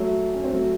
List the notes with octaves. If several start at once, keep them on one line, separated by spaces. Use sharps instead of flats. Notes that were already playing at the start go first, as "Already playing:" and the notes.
Already playing: F#3 A3
C#4
C4
F#3 A3